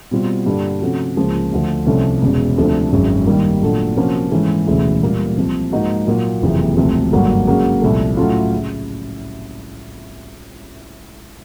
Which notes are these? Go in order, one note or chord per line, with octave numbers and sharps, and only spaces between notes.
B2 G3 C4 F4
G2 D3 G3 A#3 D4
C3 F3 A3 C#4 F#4
C#2 C#3 F3 A#3 C#4
D2 D3 F3
C2 C3 F3 A3 C#4
E1 E2 C#3
D2 C3 F3 A3 D4
G#1 F#2 C#3
G2 D#3 G3 A#3
A#2 F#3 A3 D4
C3 F3 A#3 C#4 F#4
G#2 E3 A3 C#4
E1 D2 C#3 E3
A#2 G3 A#3
C2 C3 F3
G#2 F3 A#3 D#4 F#4
A#2 F#3 A#3
F#1 F2 C3 E3 G#3
E1 D2 C3 F3
G#1 G2 D3 F#3 A#3
C#3 F#3 A#3
C2 A#2 F3 A3
A2 F#3 A3 C#4 F4
C#3